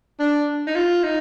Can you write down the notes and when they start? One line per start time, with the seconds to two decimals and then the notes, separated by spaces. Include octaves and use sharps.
0.19 D4
0.67 D#4
0.76 F4
1.03 D#4